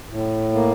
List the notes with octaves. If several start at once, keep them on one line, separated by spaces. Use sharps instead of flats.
A2
A#3